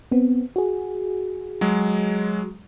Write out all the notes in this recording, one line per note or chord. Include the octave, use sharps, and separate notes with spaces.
B3 C4
F#4 G#4
F#3 G#3